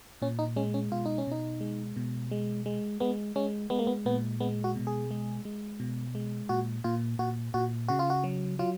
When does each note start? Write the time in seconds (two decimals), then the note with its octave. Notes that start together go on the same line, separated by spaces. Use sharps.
0.22 A#2 C#4
0.39 D#4
0.56 G#3 C#4
0.74 C#4
0.92 B2 F4
1.06 D#4
1.18 C#4
1.27 B2 D#4
1.61 G#3
1.97 B2
2.32 G#3
2.66 G#3
3.00 G#3 B3
3.36 G#3 C#4
3.70 G#3 B3
3.79 A#3
3.87 B3
4.06 A#2 B3
4.40 G#3 B3
4.64 F#4
4.76 B2
4.87 G#4
5.11 G#3
5.45 G#3
5.80 B2
6.15 G#3
6.49 A#2 F#4
6.84 A#2 F4
7.19 A#2 F#4
7.54 A#2 F#4
7.88 C#3 F#4
7.99 F4
8.10 F#4
8.24 F#3
8.59 F#3 F4